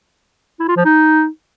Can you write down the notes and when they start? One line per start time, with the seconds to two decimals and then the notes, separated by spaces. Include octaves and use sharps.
0.60 E4
0.68 F4
0.77 F3
0.85 D#4